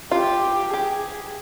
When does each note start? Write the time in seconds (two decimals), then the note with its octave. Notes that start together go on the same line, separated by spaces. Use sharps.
0.11 F4 G4
0.73 G4 G#4